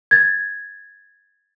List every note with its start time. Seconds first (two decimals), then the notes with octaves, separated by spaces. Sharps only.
0.11 G#6 A6